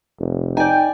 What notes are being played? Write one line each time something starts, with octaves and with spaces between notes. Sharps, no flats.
F1
D#4 D5 G5 G#5